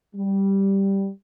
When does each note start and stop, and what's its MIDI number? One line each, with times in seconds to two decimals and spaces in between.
0.15 1.08 55